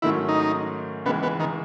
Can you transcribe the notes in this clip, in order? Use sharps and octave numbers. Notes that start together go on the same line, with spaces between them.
G#2 D#3 F#3 A3 C#4 E4
D#4
C#2 C#3 E3 G#3 B3
B3
D#3